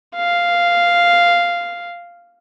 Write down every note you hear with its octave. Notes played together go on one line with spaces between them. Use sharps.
F5